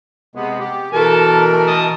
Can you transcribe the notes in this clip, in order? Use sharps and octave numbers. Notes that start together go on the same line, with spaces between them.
C3 G#3 B3
G4
B2 E3 A4 A#4 A5
A3
D#5 A5